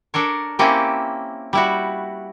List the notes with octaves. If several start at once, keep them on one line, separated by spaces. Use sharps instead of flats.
D4 A4 A#4 C#5
A#3 C4 C#4 E4 G4 A4
G3 E4 F#4